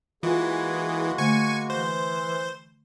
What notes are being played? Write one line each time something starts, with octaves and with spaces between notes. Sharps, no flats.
E3 G#3 A#3 F4 F#4 G#4 B4
D3 A3 G#5 C#6
E3 C5